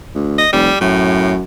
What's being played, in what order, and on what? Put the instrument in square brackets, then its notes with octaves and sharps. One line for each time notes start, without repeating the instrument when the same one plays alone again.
[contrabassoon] D2
[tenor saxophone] D#5
[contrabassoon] F1 [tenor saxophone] G3
[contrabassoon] F#2 [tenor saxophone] A2